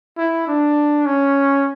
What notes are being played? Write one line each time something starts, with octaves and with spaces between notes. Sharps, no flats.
E4
D4
C#4